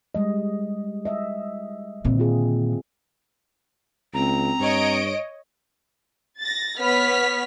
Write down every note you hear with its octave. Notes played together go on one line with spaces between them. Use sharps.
G3 G#3 D#5
D#5 E5
A#2 D3 D#3 C4
F4 G#4
C#2 C4 A#5
G2 C#5 D#5 D7
A6 A#6
B3 C#5 F6 B6